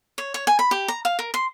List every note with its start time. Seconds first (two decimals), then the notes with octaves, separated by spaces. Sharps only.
0.18 C#5
0.34 C#5
0.47 G#5
0.59 B5
0.71 G4
0.88 A#5
1.05 F5
1.19 A#4
1.34 C6